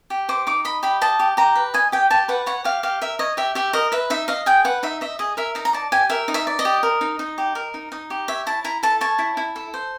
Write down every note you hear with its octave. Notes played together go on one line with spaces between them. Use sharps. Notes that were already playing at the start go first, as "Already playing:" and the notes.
G4
C5 D6
D#4 D6
D#5 B5
G4 B5
D#5 A5
G4
G4 A#5
B4
D#5 G#5
G4 G5
G4 A5
B4 F#5
C#5 F#5
G4 F5
G4 F5
A#4 E5
C#5 D#5
G4 E5
G4 E5
A#4 D#5
B4 E5
D#4 E5
D#5 F5
G#4 G5
B4 F#5
D#4 E5
D#5 E5
G#4 D#5
A#4 E5
D#4 A#5
A#5
D5 A5
G4 G#5
A#4 E5
D#4
E5
D5
D#5
G4
A#4
D#4
D#4
G4
A#4
D#4
D#4
G4
C#5 E5
E4 A5
E4 A#5
A4 A5
C#5 A5
E4
E4
A4
C5